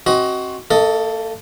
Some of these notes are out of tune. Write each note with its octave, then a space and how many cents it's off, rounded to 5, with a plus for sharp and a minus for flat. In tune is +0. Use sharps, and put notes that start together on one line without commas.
C4 +30 F#4 +20 D#5 +20
A#3 -30 A4 +10 D#5 +15